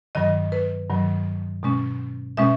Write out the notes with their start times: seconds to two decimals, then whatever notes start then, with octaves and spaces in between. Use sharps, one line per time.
0.15 G2 D#3 F#3 D#5
0.52 B4
0.89 G2 D#3 F#3
1.63 B2 G#3 C#4
2.37 B2 G#3 C#4 E5